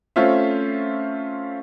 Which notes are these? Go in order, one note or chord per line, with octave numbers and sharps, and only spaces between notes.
A3 C4 C#4 F4 C5 E5